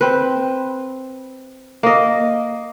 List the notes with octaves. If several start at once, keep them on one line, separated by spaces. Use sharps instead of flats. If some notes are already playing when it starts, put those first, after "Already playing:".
C4 B4
A#3 D#5